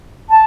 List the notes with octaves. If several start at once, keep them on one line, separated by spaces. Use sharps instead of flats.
A5